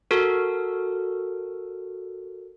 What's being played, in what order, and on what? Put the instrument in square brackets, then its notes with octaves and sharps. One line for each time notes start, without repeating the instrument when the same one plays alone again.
[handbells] F#4 A4 A#4